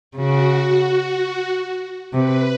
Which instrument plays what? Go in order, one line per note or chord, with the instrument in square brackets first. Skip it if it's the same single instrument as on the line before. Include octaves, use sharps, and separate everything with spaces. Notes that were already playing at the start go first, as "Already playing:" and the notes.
[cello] C#3 [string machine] F#4
[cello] C3 [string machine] B4